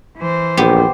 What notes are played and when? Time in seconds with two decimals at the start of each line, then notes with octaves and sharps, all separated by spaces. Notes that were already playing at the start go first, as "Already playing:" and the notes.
0.17 E3 C5
0.57 A#1 B3 G4